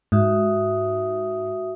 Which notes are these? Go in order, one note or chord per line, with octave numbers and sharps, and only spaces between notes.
G#2 F#4 E5 D#6